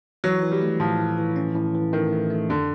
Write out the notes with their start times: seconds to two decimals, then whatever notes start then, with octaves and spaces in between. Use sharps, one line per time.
0.24 E3 F#3
0.42 E3
0.52 G3
0.62 A3
0.80 A2 F3
0.98 A2
1.18 E3
1.36 C#4
1.55 A2
1.75 E3
1.93 D#3 A3
2.13 A3
2.30 A3
2.49 F2 D3